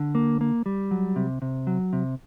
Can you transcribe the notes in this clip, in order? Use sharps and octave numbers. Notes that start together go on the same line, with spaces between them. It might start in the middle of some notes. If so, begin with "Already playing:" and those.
Already playing: D3
A#3
A#3
G3
F#3
C3
C3
F#3
C3